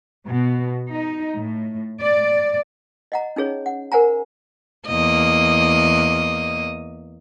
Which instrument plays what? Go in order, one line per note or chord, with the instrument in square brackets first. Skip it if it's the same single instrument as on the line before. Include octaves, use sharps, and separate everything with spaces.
[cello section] B2
D#4
A2
D5
[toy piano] D#5 F#5 A#5
C#4 D#4 G#4 C#5
F#5
A#4 C5 F#5 G#5 A#5
[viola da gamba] E2 A#3 D#5